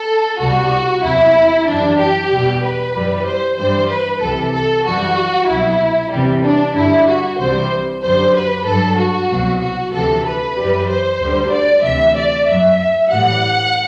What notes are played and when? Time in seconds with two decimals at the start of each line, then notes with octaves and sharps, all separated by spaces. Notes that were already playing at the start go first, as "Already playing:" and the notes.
Already playing: A4
0.40 C2 B2 G3 F#4
1.03 E2 C3 F#3 E4
1.67 F#2 E3 G3 D4
1.99 G4
2.31 E2 B2 G3
2.63 B4
2.94 F#2 E3 G3
3.25 C5
3.57 G2 E3 G3 C5
3.89 B4
4.21 C2 C3 E3 A4
4.53 A4
4.85 F#2 E3 G3 F#4
5.48 C2 B2 F#3 E4
6.11 E2 C3 E3 G3
6.43 D4
6.75 G2 D3 G3 E4
7.07 F#4
7.38 C2 C3 E3 G3 C5
8.02 F#2 D3 G3 C5
8.34 B4
8.65 G2 F#3 A4
8.97 F#4
9.29 C2 B2 F#3
9.61 F#4
9.92 D2 C3 E3 A4
10.24 B4
10.56 F#2 E3 G3
10.87 C5
11.20 D2 D3 G3
11.51 D5
11.83 D2 C3 E3 E5
12.16 D5
12.47 F#2 F#3 E5
13.10 A2 E3 G3 F#5